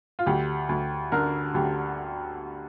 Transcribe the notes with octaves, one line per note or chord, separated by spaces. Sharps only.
F4
D2 G4
D2
D3 A#4
D2 G4